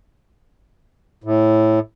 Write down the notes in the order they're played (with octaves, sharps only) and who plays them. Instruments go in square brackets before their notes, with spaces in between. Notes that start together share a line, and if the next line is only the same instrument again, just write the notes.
[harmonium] A2